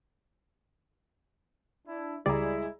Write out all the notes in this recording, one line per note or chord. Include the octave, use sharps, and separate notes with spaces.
D4 E4
C#2 G3 G#3 E4 G#4 D5 A#5